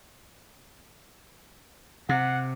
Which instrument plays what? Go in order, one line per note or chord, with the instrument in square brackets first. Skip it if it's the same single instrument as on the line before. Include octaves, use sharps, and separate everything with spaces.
[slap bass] C3 [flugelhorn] F#5